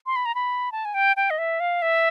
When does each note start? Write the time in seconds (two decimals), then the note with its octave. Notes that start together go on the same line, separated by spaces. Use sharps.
0.06 C6
0.16 B5
0.26 A#5
0.35 B5
0.72 A5
0.85 G#5
0.94 G5
1.16 G5
1.30 D#5
1.38 E5
1.60 F5
1.82 E5